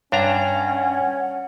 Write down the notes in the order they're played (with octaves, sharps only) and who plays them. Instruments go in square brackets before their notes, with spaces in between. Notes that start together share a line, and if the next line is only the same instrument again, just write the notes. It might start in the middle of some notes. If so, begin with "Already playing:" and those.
[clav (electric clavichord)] G2 D4 A#5 [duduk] C#4 [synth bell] C#5 [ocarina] F#5